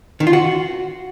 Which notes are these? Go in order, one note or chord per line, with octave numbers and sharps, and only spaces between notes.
D#3
F4
F#4